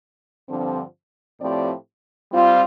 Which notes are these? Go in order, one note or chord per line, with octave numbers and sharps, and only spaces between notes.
G2 D3 F3 C4
A2 F3 C4 G4 D5
G3 C4 F4